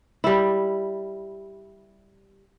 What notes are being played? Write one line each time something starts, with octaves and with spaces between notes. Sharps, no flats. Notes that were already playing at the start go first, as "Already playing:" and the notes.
G3 E4